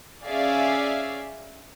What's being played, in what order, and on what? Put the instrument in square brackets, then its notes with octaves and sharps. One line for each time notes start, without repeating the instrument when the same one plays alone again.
[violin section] C#4 G#4 D5 E5 F5